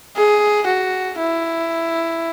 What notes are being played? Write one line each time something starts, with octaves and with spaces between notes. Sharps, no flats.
G#4
F#4
E4